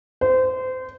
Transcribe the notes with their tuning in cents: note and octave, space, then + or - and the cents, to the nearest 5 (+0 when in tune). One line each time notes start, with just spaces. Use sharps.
C5 -25